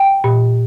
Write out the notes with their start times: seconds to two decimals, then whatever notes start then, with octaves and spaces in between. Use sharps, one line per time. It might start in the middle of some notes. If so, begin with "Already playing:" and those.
Already playing: G5
0.24 A#2